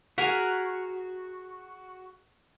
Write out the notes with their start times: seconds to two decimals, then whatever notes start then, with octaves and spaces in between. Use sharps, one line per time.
0.18 F#4 G#4 A#4 F#5 G#5 B6 F7